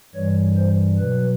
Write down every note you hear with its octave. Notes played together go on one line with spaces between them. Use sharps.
G2 E3 G3 C#5
C5
B2 F#3 B4